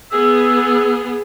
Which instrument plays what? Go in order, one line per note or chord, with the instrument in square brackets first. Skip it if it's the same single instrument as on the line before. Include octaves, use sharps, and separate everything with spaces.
[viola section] B3 G#4 [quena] E6